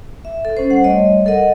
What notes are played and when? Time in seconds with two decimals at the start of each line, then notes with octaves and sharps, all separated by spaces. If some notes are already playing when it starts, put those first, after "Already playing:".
0.25 E5
0.45 A4
0.57 C#4 C5
0.70 G3 F#5
0.84 G3 A3 C#5 D#5
1.26 A4 A#4 D#5 F#5